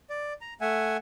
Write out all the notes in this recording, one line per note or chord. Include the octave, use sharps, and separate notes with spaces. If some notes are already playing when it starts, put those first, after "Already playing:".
D5
A#5
A3 E5 F#5 G#5